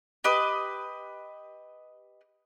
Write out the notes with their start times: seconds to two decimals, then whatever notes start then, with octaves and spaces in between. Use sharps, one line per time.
0.24 G4 B4 D#5